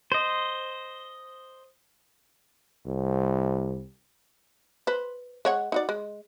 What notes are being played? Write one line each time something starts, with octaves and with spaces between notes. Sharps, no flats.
C5 D#5
C2
B4 C5
G#3 C#5 F#5
D#4 F#4 D5
G#3